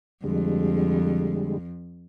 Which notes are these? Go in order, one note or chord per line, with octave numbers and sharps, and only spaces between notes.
F2 D3 G3 G#3